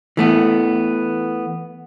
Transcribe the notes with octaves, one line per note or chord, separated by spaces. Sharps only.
E3 A3 B3